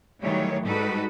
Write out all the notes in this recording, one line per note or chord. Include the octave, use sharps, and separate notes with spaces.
D#3 E3 F#3 G3 A3 C#5
G#2 G3 D#4 F#4 A4 B4